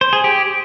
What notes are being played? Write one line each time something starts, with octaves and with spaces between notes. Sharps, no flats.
C5
G#4
G4